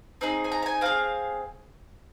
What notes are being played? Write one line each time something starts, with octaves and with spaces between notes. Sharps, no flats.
C4 D#4 G#4
G#5
A#5
A#5
G#5
C4 G#4 F5